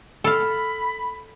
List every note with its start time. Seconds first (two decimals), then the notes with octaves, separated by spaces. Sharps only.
0.24 A4 F5 B5